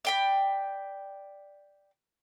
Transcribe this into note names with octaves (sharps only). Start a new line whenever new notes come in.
D5 G5 B5